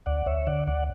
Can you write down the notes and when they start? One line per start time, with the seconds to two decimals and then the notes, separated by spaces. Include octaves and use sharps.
0.06 D2 D5 F#5
0.26 D2 C#5 E5
0.47 D3 D5 F#5
0.67 D2 D5 F#5